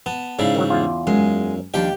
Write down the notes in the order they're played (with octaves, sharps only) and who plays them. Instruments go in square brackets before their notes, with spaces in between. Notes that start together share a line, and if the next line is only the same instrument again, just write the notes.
[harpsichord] B3 [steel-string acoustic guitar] A5
[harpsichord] G#2 C#3 E4 [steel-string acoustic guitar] D5 F5
[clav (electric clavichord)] D#3 F#3 [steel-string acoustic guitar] G3
[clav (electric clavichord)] E2 F4
[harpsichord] F#2 [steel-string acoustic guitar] G#3
[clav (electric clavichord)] D#2 [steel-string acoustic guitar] F3 G3 D4 [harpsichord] G4 G5